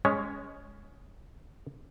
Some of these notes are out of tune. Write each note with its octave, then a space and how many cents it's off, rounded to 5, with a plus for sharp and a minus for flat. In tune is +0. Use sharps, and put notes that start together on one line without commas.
G#3 +0 C#4 +20 C#5 +0